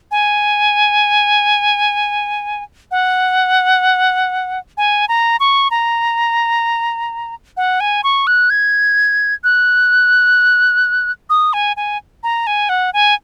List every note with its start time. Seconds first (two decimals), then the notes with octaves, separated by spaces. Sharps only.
0.11 G#5
2.91 F#5
4.77 G#5
5.08 A#5
5.40 C#6
5.71 A#5
7.57 F#5
7.80 G#5
8.04 C#6
8.27 F#6
8.50 G#6
9.44 F#6
11.30 D#6
11.53 G#5
11.76 G#5
12.23 A#5
12.47 G#5
12.69 F#5
12.93 G#5